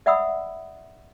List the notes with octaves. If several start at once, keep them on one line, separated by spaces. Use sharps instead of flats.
D5 E5 F#5 B5 D#6 E6